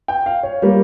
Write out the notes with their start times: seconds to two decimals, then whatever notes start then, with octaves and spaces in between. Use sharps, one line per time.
0.08 G5
0.26 F5
0.43 C#5
0.62 G3 A#3